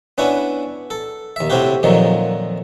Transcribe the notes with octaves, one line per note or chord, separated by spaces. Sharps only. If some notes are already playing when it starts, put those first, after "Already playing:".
B3 C#4 D4 E4 F#4
A4
D#2 E5
A2 C3 C4 E4 F#4 G4
F2 A#2 D#3 F3 F#3